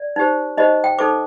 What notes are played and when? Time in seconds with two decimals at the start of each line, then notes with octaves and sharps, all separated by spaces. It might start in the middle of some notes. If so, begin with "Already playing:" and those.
Already playing: D5
0.16 D#4 G4 C5
0.58 D#4 G4 C5 D#5
0.84 G5
0.99 D#4 A4 C5 D6